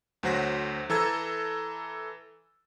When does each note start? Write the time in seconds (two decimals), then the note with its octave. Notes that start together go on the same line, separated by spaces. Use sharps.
0.23 D2 F#3 C5 F#5 A#6 B6
0.90 E3 A4 A#5 E6 G#6 A6